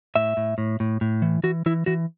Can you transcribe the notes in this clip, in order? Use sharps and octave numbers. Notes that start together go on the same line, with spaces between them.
A2 E5
A2
A2
A2
A2
E3
E3 F#4
E3 E4
E3 F#4